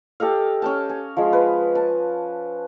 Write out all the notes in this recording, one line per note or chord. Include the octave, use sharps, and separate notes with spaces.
G4 A4 D#5 F5
C#4 G5 A5
G#5
F3 G#3
B4
A5